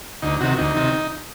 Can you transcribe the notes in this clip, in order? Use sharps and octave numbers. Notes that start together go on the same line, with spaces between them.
D2 D#4
C3 D#3 F#4
D2 D#4
C3 D#3